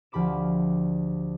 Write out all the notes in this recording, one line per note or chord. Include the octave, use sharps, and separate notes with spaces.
D2 F3 G4 B5 D6 E7